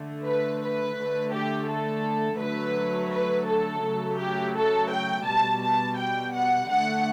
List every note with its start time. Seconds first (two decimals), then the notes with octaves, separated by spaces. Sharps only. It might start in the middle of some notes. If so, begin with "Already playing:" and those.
Already playing: D3 A3
0.25 B4
0.61 B4
0.96 D3 A3
1.33 G4
1.69 A4
2.40 D3 F#3 A3 B4
3.12 B4
3.47 A4
3.83 C#3 F#3 A3
4.19 G4
4.55 A4
4.91 G5
5.26 B2 G3 A5
5.63 A5
5.98 G5
6.34 F#5
6.70 D3 A3 F#5